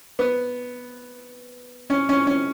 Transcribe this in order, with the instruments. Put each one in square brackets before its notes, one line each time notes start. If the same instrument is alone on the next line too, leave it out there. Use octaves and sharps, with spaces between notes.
[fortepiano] B3
C#4
C#4
C#4